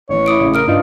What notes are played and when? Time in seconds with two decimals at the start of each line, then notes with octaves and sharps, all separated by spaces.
0.09 A1 E3 C#5
0.26 E4 D6 D#6 D7
0.40 A1 C#3
0.54 A#4 D#6 F6 D7
0.68 G2 D4 D#4 F4